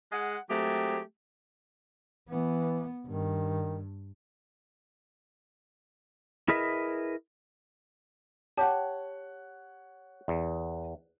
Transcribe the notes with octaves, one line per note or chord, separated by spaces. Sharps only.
G#3 F#5
F#3 G#3 A3 C4 G4
E3 B3
G2 D#3
E4 G#4 A#4 B4 D#5 E5
G4 C#5 F#5 A5
E2